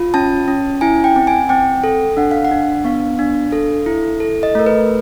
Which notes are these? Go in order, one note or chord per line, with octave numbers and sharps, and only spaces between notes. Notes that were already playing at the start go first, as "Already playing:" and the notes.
Already playing: F4
C#4 A5
C#4
E4 G#5
G5
C4
G#5
C4 G5
A4
D4 F#5
F5
F#5
D4
B3 F5
D4
A4
E4
A4
D#5
A3 A#4
B4